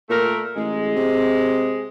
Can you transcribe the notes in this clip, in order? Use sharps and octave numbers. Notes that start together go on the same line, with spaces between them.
A#2 A3 A#4
A1 G#3
C3